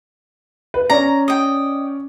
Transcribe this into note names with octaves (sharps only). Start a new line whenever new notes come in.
B4
C#4 D5 A#5
D#5 G5